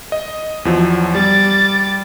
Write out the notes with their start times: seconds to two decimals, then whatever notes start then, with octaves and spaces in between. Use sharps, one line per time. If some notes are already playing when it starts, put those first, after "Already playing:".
0.12 D#5
0.65 E2 F3 F#3
1.15 G3 D6 A6